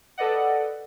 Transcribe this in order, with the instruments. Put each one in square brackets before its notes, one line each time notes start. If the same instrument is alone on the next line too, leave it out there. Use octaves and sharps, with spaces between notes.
[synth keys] A4 B4 D5 D#5 F#5